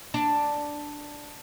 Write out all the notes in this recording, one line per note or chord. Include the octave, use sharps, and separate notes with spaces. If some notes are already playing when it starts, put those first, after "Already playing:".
D4